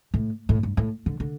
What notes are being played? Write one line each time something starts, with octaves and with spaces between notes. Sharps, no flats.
A2
A2
G2
A2
D3
D3